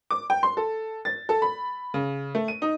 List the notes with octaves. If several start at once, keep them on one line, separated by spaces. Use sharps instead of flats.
D6
G5
C6
A4
A6
A4
B5
C#3
A3
D#7
D#4